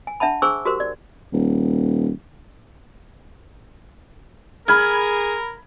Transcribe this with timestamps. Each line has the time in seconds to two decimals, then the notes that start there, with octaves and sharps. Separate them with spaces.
0.07 G#5
0.20 D4 E5 F#5 A5 B5
0.42 D4 G#4 C5 G#5 C#6 E6
0.65 F#4 G4 A#4 C5
0.80 D5
1.32 D#1
4.68 G#4 A#4 B5 F6 G#6